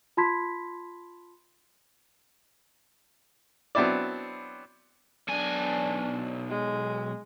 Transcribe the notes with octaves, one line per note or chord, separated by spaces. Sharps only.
F4 A5 B5 C6 G#6 B6
F#3 B3 C4 D4 E4 D5
B1 D4 G#5
G#3